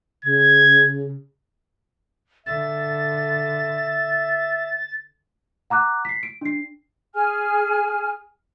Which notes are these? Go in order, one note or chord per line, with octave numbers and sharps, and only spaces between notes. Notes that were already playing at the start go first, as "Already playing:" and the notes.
C#3 G#6
D3 E5 A6
F#5 A#5 D6 F#6
B6 C7
D7
D4 C7
G#4 G#5 F6